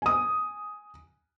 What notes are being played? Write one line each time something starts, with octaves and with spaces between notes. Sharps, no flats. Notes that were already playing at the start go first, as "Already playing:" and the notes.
G#5 D#6